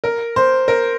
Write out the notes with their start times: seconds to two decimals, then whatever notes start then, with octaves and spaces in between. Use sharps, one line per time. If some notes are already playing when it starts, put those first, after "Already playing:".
0.04 A#4
0.36 C5
0.68 A#4